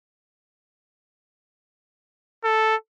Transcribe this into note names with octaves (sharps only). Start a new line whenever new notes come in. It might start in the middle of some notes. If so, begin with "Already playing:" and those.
A4